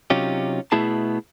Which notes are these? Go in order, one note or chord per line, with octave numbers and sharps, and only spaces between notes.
C3 F#3 C#4 D#4 F4 G4
B2 A3 B3 E4 G#4 A5